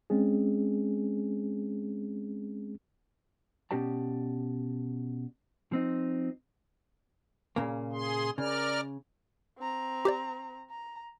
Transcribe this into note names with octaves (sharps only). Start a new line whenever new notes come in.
G#3 C4 C#4 G#4
B2 C#4 G4 D5 A5
F3 C4 D#4
A#2 C#3 A#3
G#4 C6
C#3 A#4 D5 F6
C4 A#5
G4 C5 D5
A#5